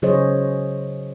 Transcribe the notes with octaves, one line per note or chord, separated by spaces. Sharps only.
C#3 F#3 G#4 C5 C#5 D#5